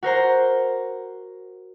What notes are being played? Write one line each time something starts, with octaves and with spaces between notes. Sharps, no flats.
F#4 A#4 C5 A#5